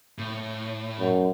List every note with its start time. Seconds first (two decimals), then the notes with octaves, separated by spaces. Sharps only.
0.18 A2
0.99 F#2